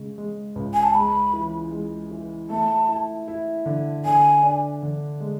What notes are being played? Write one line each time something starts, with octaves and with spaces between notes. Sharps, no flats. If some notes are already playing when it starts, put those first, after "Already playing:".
Already playing: C#3 G#3
G#3
C#2
G#5
A5
G#3 B5
E3
G#3
E3
A3 A5
E4
E4
D3
D3 G#5
D4
D3
G#3